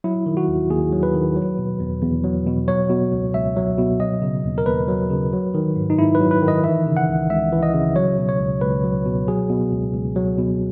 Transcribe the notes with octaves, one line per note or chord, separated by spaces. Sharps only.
F#3 E4
D#3
F#4
D#2
D#2 G#4
F#3
B4
D#3
F#3
B2
E2
E2
F#3
B2
F#3 C#5
B2
C#2
C#2 E5
F#3
B2
F#3 D#5
C#3
D#2
A#4
D#2 B4
F#3
C#3
F#3
D#3
G#2
D#4
G#2 E4
B4
F#3
B4
D#3
D#5
E3 E5
C#3
F#5
C#2
C#2 E5
E3
D#5
C#3
F#3 C#5
B2
C#5
C#2
C#2 B4
F#3
B2
F#3 G#4
B2
C#2
C#2
F#3
B2